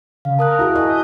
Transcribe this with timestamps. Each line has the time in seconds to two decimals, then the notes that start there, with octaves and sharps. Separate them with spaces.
0.25 C#3 F5
0.39 A#4 A5 D#6 F#6
0.59 E4 F#4 G#4
0.76 E4 D#5 G#5 A5 F#6
0.88 D#6 G6